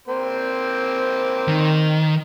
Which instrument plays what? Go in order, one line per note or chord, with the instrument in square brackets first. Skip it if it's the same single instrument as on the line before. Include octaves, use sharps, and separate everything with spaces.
[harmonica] A#3 C4 C5
[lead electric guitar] D#3